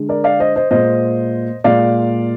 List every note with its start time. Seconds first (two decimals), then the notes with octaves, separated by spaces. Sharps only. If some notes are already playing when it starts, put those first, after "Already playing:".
Already playing: D3 G#3
0.09 A#4 D5
0.24 D5 F5
0.40 C5 D#5
0.56 C5 D#5
0.71 A#2 G#3 C5 D#5
1.64 A#2 G#3 D5 F5